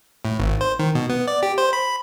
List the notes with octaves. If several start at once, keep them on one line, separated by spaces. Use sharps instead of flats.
A2
G#1
C5
D#3
B2
B3
D5
G4
C5
B5